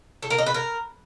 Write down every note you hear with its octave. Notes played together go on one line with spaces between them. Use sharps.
A4
A#4
D#5
B4
A#4